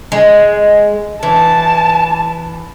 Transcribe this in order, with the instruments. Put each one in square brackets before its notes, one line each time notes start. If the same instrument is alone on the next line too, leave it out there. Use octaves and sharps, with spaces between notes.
[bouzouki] G#3
[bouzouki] E3 [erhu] A5